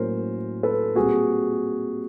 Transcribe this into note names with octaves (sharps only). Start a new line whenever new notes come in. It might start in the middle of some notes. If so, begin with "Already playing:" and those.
Already playing: A2 F#3 A#3 C#4 A#4 C5
A4 B4
A#2 G3 C4 F#4 G#4